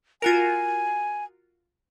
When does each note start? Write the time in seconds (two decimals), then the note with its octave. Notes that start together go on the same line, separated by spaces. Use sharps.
0.22 F4 F#4 A#4 G#5